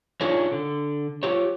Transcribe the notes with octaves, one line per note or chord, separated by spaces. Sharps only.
D4 D#4 F4 G#4 A#4 C#5
D3
F4 G4 C#5